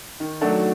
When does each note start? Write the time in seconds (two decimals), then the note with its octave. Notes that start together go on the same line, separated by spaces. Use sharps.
0.20 D#3
0.41 F#3 A3 D4 F#4